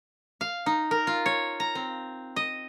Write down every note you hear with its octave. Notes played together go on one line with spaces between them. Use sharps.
F5
D#4
A#4
F4
C#5
A#5
C4
D#5